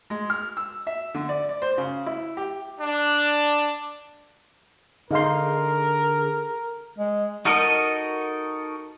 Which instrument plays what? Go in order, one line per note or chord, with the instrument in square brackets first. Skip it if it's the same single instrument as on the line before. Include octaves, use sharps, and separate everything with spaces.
[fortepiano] G#3
F6
E6
E5
D3
D5
D5
C5
C#3
E4
G4
[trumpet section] D4
[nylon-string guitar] D3 [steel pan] D#4 F5 C6 [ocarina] G#4 [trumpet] A#4
[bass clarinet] G#3
[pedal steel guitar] D#4 F#4 A4 A#4 D#5